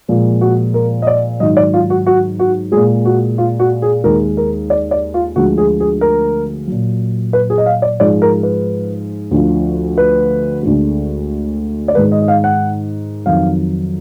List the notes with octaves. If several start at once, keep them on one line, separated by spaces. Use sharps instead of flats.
A#2 F3 G#3
F#4
A#4
D#5
D5
G#2 D#3 F#3 D#5
D5
F4
F#4
F#4
F#4
A#2 G#3 G#4
F#4
F4
F#4
G#4
D#2 D#3 G#3 A#4
A#4
D5
D5
F4
D2 D3 F3 G#3 F#4
G#4
G#4
A#4
A#2 F#3
B4
G#4
D#5
F5
D5
G#2 F3 G#3 D5
A#4
B4
D2 D3 F3
B4
D2 D3 G#3
D5
G#2 D#3 G#3 B4
D#5
D#5
F5
F#5
F2 D#3 F#3 F5